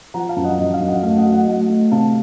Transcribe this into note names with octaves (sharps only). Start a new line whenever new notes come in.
F3 F#5 A#5
F5 A5
F#2
D#5 F#5
F#2 D#5
F5
F#2
D#5 F#5
A3 F5
D#5 F#5
F#3
D#5 F#5
A3 D#5 F#5
A3
C3 F5 A5